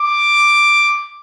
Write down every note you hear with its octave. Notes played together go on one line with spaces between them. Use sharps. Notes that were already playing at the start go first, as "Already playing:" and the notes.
Already playing: D6